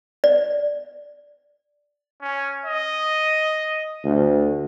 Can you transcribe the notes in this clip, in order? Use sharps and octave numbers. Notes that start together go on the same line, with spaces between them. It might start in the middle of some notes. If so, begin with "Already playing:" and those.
D5
C#4
D#5
D2